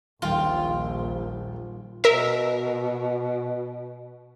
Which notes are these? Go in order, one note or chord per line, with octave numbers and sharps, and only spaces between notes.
D#1 A#1 D#3 F4 G5
B2 A#4 E5